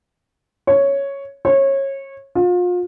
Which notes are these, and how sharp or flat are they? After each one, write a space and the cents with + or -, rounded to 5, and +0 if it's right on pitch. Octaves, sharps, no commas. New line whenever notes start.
C#5 +0
C#5 -25
F4 +35